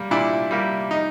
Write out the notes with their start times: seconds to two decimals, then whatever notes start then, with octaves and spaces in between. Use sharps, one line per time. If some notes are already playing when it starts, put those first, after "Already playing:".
Already playing: G3 A#3
0.11 A#2 D4 E4
0.51 G3 A#3
0.91 D#4